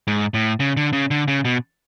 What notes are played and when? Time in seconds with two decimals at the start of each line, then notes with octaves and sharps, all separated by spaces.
0.07 G#2
0.34 A2
0.60 C#3
0.77 D3
0.93 C#3
1.11 D3
1.28 C#3
1.45 B2